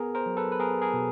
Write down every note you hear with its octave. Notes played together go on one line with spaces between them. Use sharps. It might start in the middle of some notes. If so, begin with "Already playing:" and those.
Already playing: B3 G#4 A#4
A#4 C5
F#3
A4 B4
B4
B3 G#4 A#4
G#4 A#4
B2